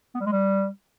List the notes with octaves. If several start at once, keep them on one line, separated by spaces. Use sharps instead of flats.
B3
G3
G#3
G3